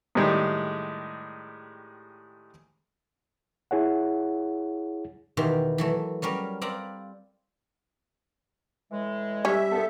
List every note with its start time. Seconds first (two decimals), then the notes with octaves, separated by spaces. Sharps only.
0.15 A2 D#3 G3 G#3 G4 G#4
3.71 E4 G#4 C#5 F#5
5.37 E2 B2 D#3 E3 G4 C6
5.78 E3 F#3 A3
6.22 F#3 G3 C#4 A#4
6.62 C4 D5 F5 A#5 B5
8.91 A2 E3 G#3
9.45 G3 C#4 E5
9.72 C2 G2 B3 A4